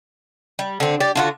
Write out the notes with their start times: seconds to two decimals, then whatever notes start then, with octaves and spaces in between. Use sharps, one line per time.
0.59 G3
0.80 D3 C4
1.00 G4 D5
1.15 D3 F4 F#4